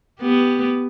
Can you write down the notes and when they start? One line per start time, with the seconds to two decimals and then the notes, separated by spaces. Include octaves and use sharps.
0.20 B3 G4